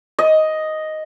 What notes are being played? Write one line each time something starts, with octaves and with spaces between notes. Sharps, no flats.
D#5